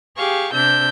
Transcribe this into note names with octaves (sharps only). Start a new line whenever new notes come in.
G4 G#4 F5 C#6
C3 D4 E6 G6